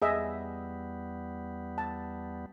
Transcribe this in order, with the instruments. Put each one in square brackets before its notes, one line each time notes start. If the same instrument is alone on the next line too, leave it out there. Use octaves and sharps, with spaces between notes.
[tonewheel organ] E2 G3 B3 [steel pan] G#4 D#5 E5
[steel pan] A5